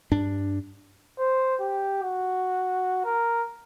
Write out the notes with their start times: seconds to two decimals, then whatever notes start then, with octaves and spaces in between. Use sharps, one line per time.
0.12 G2 D4
1.19 C5
1.60 G4
2.03 F#4
3.04 A#4